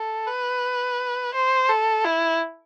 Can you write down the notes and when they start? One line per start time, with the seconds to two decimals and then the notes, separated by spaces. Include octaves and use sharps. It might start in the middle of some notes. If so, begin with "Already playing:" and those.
Already playing: A4
0.28 B4
1.34 C5
1.69 A4
2.05 E4